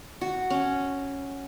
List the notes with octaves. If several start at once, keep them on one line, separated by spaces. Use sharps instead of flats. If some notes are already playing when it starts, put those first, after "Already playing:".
F#4
C#4